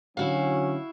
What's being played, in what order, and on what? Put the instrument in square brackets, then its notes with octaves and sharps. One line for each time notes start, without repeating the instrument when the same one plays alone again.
[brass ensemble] D3 F#3 C#4 [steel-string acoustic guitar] E4 F#4 F5